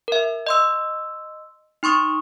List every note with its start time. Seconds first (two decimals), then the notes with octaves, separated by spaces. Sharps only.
0.08 A#4 E5
0.47 D#5 C6 E6
1.83 D#4 C6 C#6 D#6